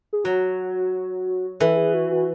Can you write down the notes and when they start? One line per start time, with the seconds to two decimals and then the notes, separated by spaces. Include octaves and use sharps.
0.13 G#4
0.24 F#3 F#4
1.60 E3 A4
1.77 G#4
1.94 F#4
2.11 F#4